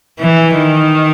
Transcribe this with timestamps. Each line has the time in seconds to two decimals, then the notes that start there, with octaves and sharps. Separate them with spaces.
0.20 E3
0.56 D#3